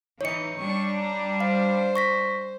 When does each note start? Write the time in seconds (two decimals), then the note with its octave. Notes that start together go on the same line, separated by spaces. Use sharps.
0.21 E3 D#4 C#5 C#7
0.59 G3 D4 C#6
0.98 A#5
1.40 C5 F5
1.96 C#6 A#6 B6